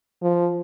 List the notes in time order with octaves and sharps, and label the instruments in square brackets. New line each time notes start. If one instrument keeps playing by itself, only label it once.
[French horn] F3